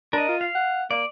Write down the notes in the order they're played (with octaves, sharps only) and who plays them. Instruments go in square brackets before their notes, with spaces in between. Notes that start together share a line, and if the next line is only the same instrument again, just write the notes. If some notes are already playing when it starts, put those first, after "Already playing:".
[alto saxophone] D4 [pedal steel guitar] A#4 D#5
[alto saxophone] F4
[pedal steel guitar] F5
[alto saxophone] F#5
[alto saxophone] A#3 [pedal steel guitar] D5